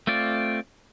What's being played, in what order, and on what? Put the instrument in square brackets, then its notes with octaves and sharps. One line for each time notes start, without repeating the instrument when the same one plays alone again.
[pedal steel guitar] A3 C4 F4 D5